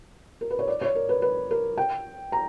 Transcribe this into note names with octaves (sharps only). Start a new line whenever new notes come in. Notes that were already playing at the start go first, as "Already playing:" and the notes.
A#4
B4
C#5
D5
C#5
A#4
B4
B4
A#4
G5
A#5